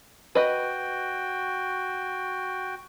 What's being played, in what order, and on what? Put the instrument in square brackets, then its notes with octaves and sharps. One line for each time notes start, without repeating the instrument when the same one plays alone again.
[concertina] F#4 G5 [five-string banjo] B4 D#5